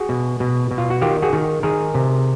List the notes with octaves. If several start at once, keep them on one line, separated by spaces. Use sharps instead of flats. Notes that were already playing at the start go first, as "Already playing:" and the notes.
Already playing: F#4 G#4
B2
B2
B2
F4
F#4
D#3 F4 G4
F#4 G#4
D#3
D#3 G#4 A#4
C3